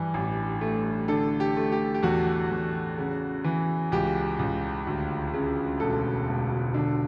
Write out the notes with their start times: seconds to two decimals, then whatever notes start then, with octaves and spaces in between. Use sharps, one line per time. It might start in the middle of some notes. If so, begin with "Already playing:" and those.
Already playing: G2 E3
0.14 A1
0.61 A3
1.08 D3 A4
1.40 G4
1.57 A3
1.72 G4
1.94 G4
2.03 E2 F#4
2.51 E2
2.98 C#3
3.44 E3
3.92 C#2 G4
4.39 C#2
4.87 D2
5.34 C#3
5.80 E1 A4
6.28 E1
6.74 D3